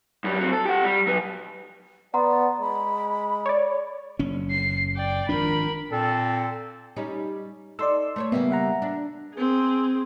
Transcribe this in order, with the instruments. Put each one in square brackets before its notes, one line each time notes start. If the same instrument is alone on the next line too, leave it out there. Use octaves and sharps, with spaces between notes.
[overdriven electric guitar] F#2 G3
F#3 C4
A4
G4 F#5
G3
F#3 B4
[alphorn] B3 [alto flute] D5 [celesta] F#5 A#5 C6
[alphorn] G#3 [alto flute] B5
[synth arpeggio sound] C#5 D5
[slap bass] F#1 C#4
[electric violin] C7
D5 G5
[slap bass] G#1 F3 D4 [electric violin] A#4 B5
[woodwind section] A#2 C4 [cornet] A4
[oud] G3 C#4 D#4
[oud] D#4 A4 [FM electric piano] D5 C6 E6
[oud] A3 C5 C#5
[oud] C#3 G3 A#3 [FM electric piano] B3 E5
[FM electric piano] E5 F#5 A#5
[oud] D4
[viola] C4 G#4